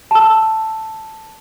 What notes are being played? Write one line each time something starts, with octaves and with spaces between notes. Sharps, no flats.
A5 E6